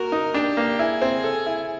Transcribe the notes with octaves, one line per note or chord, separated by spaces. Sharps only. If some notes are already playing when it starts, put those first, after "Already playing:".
Already playing: A#3 F#4 A#4
D#4
D4 G4
A#3
E4 G#4
C4
A4
E4